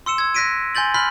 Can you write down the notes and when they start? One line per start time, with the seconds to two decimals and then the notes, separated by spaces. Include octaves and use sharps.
0.06 C6 E6 C#7 E7
0.18 E6 G#6
0.35 F#6 A#6 B6 D7 D#7
0.75 G#5 C6 G6 A6 F#7
0.94 B5 C6 F6 F#6 B6 F#7